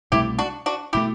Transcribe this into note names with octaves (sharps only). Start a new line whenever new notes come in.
C2 B2 A3 E4 G4
D4 F#4
D4 F#4
B2 A3 E4 G4